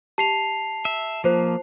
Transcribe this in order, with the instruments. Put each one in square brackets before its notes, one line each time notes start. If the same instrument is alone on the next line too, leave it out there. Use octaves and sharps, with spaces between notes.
[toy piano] G4 [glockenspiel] A5 C7 F7
[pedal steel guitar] E5
[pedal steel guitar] F3 A#3 [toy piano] F4 C5